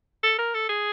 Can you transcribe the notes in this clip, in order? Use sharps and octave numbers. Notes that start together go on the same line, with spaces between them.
A4
A#4
A4
G#4